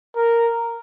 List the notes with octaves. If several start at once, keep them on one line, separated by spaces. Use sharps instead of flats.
A#4